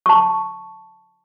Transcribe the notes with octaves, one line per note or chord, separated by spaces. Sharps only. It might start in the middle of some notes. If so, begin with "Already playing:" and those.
A5 C#6